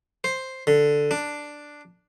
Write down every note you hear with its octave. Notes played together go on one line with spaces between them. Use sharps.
C5
D3
D4